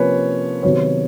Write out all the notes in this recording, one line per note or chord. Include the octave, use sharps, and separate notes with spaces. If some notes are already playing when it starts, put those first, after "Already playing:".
Already playing: C3 F3 A#3 C#4 B4 C#5
C3 D#3 F#3 B3 C#5